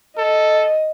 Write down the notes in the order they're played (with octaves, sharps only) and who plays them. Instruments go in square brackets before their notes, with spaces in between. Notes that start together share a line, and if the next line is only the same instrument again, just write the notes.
[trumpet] A4 [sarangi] D#5